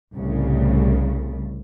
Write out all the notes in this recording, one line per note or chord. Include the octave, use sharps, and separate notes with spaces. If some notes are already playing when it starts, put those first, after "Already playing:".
C2 A2 C#3